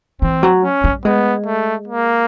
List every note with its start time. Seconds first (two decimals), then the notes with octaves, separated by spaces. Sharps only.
0.22 E3 C4
0.43 F#3
0.63 C#4
0.84 G3
1.05 G#3 B3
1.46 A3
1.88 A#3